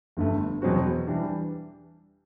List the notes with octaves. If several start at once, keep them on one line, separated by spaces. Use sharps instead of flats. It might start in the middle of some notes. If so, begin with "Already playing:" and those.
G1 G2 D3 A3
E2 B2 F#3 C4 F#4
E3 G3 D4